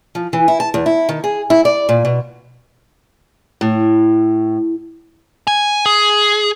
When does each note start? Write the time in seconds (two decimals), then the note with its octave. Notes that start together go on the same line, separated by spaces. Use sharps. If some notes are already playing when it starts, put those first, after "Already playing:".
0.15 F3
0.33 E3
0.48 E4
0.60 A5
0.74 E2
0.86 E4
1.09 D#3
1.24 G#4
1.50 E4
1.65 D5
1.89 A#2
2.05 B2
3.61 A2
5.47 G#5
5.86 G#4